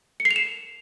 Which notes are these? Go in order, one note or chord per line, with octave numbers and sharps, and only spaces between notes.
C#7
C7
F7
E7